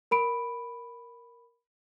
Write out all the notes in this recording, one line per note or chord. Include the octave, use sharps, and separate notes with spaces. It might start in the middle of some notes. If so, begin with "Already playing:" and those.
A#4 B5 D7